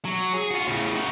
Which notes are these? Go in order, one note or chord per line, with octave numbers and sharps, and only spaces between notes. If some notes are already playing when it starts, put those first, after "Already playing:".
F#3
G#4
F4 F#4
A2 C#3
D#4 F#4